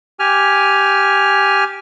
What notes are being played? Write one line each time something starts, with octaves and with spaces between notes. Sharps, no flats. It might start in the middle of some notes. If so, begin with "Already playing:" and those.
G4 G#5 F6